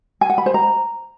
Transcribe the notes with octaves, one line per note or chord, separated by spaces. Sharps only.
G#5
F#5
B5
C5
A#5